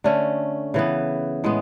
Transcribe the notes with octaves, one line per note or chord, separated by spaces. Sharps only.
D3 A3 C#4
C#3 E3 B3
A2 G#3 B3